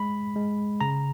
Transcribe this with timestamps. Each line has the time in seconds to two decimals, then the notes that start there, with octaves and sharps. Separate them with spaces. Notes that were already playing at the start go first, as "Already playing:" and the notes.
Already playing: G#3 B5
0.36 G#3
0.81 C#3 A#5